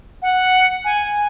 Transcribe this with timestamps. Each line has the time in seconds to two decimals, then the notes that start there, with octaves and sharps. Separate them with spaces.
0.22 F#5
0.85 G#5